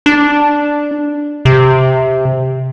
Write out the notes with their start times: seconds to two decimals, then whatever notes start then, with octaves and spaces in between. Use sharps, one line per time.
0.06 D4
1.45 C3